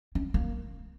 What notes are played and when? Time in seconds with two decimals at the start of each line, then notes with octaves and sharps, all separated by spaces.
0.15 C#4
0.34 A#3